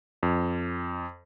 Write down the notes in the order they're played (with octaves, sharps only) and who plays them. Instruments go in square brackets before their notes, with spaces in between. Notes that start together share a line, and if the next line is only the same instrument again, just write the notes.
[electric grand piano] F2